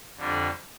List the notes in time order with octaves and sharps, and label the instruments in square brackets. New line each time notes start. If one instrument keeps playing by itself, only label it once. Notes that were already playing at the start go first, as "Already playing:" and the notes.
[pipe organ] F2 D3 G3 D4